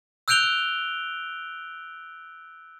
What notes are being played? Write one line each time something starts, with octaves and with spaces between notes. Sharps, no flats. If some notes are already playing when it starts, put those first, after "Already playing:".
E6 F#6 G6 D7 F7 G7